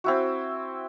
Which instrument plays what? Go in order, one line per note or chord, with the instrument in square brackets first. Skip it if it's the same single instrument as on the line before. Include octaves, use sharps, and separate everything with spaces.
[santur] C4 E4 F#4